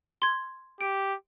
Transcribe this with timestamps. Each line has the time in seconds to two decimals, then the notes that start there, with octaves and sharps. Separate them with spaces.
0.22 C6 G#6
0.81 G4 D7